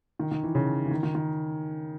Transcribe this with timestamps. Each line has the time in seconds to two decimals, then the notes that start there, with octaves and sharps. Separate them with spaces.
0.19 D#3
0.31 D#3
0.43 E3
0.55 C#3
0.85 E3
0.91 D#3
1.03 D#3
1.15 D#3